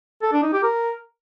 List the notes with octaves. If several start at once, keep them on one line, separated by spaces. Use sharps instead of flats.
A4
D4
D#4
G4
A#4